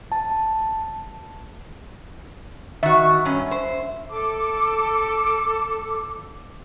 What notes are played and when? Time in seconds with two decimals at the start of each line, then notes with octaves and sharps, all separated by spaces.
0.12 A5
2.83 D#3 F#4 E5
3.25 G2 C#4
3.51 C5
4.10 A4 D6